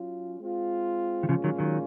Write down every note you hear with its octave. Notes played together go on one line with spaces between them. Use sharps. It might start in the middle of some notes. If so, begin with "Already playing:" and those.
Already playing: F#3 C#4 F4
G#3 C4 F4
D#3
A#2 C#3 F3 G#3 C#4 F4
D#3 F#3
D#3 F#3